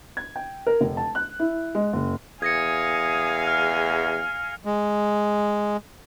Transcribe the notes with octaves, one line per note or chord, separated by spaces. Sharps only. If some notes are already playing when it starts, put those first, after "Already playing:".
G#6
G5
A#4
F1
A5
F#6
E4
G#3
F#1
E2 F5 G#5 D#6 G#6 A#6 C#7
G#4 F6
G#3